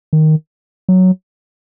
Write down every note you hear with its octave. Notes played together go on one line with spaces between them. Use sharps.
D#3
F#3